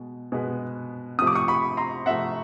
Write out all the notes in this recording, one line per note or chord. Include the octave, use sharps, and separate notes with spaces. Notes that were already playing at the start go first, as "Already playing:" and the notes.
Already playing: B2 G#3
B2 G#3 B3
C3 F3 A3 D#6
D6
C#6 D#6
B5 C#6
A#5 C6
C3 F3 A3 E5 F#5